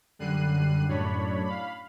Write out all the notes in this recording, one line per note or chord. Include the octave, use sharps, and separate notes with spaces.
F#2 D3 G3 F#6 C7 D#7
F#2 A2 D4 C#5 B5
F5 B5